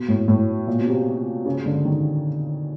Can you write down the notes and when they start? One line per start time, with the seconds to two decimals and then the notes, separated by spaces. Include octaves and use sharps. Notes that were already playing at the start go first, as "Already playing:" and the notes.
Already playing: B2
0.08 A2
0.28 A2
0.67 A#2
0.79 B2
0.87 C3
1.46 C#3
1.66 D3
1.85 D#3